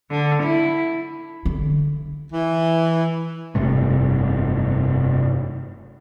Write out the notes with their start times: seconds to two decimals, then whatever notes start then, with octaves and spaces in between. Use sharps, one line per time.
0.10 D3
0.43 E4
1.45 D3
2.32 E3
3.55 F1 G2 C3 A3